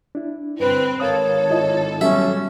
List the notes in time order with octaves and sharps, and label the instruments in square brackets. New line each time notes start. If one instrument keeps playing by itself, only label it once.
[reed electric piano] D4 E4
[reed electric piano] G2 [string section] D3 C4 [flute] B4
[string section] G#1 A4 [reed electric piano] A#4 F5 D#6 [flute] C#5
[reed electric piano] E4 F4 D#5
[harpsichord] B1 E5 [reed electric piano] G3 [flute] C#4